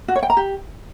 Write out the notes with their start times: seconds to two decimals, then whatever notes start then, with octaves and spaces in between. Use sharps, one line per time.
0.08 F#4
0.15 C#5
0.23 G5
0.30 A#5
0.37 G4